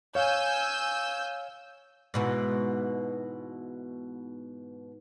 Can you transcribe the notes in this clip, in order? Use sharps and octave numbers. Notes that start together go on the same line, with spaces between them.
C#5 F5 G#5 E6 G6
G#2 B2 E3